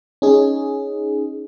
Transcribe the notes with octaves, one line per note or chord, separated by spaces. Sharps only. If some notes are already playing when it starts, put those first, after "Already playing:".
C#4 D#4 G#4